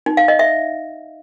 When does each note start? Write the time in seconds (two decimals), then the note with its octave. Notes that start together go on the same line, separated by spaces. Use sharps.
0.06 D#4
0.17 F5
0.28 D#5
0.39 E5